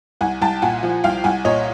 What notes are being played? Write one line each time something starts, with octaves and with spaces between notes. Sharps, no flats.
C2 F#5 G#5
C2 G5 A5
A#2 F#5 G#5
F3
C2 F5 G5
C2 F#5 G#5
A#2 C#5 D#5